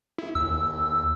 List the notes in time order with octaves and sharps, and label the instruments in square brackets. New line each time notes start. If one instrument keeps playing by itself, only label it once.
[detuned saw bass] E4
[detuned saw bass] D#2 [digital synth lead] E6
[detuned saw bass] D#2